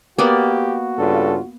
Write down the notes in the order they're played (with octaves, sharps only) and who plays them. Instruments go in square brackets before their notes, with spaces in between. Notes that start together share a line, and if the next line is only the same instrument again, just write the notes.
[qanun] A#3 B3 D5 [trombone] F#4 [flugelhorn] G4
[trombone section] G2 C#3 F4 [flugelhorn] A4